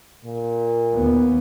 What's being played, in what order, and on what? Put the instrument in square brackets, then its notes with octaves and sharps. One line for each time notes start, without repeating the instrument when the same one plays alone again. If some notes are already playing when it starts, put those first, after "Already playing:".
[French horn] A#2
[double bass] D#2 B3